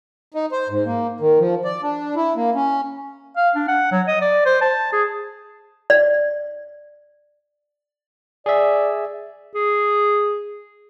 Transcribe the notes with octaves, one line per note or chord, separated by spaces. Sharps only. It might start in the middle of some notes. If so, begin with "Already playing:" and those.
D#4
C5
G#2
A#3
D#3
F3
D5
D4
E4
A#3
C#4
F5
D4
F#5
F#3
D#5
D5
C5
A5
G#4
D5
G#4 D5 E5
G#4